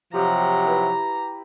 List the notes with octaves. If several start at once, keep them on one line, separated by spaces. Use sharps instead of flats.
C3 F3 F#3 G4 A#5
E4 B4